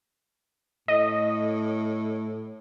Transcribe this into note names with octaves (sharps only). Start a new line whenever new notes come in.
A2 D#5